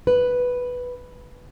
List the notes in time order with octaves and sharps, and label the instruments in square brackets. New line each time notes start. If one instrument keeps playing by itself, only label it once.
[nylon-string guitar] B4